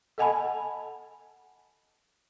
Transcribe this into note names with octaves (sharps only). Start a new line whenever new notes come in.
A4 D#5 F#5 G#5 A5 B5